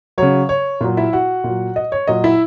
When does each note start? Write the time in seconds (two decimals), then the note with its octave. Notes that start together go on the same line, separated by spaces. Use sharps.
0.18 C#3 F#3 C#5
0.49 C#5
0.81 A#2 F#3
0.97 E4 E5
1.13 F#4 F#5
1.44 A#2
1.49 F#3
1.76 D#5
1.92 C#5
2.07 A#2 F#3 D#5
2.24 E4 E5